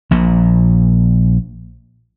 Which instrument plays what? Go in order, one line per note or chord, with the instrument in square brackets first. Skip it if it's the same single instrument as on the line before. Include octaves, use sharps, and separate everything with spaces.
[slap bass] A#1 A#2